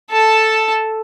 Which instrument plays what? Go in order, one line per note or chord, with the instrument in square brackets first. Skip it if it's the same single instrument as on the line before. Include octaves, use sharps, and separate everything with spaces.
[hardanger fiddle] A4 A5